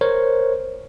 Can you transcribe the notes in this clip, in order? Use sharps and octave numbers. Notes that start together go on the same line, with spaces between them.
A#4 C5 C#5